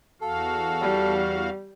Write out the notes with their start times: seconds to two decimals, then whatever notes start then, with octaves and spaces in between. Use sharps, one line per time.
0.21 E2 F#4 A4 F5
0.81 G3